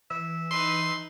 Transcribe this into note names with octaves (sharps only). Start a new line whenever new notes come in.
E3 E5
D#4 B4 C6